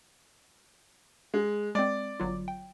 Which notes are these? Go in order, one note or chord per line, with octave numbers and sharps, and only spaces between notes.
G#3
G#3 C4 D5
G1 F#3 F4
G5